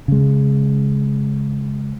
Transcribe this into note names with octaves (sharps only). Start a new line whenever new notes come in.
C#3 G#3